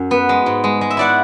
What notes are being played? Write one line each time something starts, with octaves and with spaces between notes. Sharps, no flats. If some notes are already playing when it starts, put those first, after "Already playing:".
Already playing: F#2
B3
G#3
G#2
G#3
G#3
E5
E4 D5 F#5